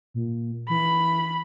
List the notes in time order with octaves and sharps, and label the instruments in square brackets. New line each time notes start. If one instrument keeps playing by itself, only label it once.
[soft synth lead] A#2
[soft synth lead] E3 [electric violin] B5